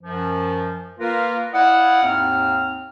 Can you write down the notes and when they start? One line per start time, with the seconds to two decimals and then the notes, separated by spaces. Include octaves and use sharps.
0.02 F#2 F3
0.99 A#3 F4 A#4 B4
1.53 E4 D5 D#5 F5 F#5
2.03 D#2 G#2 C4 F6